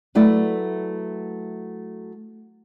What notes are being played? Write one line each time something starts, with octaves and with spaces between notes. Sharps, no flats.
F#3 A3 E4 B4 D5